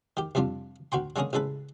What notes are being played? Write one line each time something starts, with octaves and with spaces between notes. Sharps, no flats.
D#3 G4
C2 F2 G3 D4 F4
D2 F#4 G5 C6
D3 G#3 A#3 C#4 G#4 A#4
A1 C#3 G#3 A4 B4